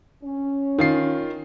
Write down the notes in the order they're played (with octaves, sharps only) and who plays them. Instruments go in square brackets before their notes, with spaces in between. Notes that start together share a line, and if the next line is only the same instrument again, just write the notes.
[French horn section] C#4
[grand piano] D#3 F4 C7